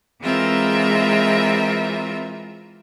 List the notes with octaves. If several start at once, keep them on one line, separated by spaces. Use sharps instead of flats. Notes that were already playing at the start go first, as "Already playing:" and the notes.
E3 G#3 C4 F4 A#4 E5